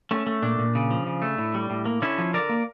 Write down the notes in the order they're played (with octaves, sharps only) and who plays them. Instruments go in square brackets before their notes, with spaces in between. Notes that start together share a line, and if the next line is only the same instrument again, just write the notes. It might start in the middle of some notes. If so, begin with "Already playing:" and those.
[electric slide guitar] A3 C#4
A3
A#2 D4
A#2
C#3
F3
C#3
A3
A2
G3
A2
A#3
D3 C#4 E4
F3
D3 A#4 D5
A#3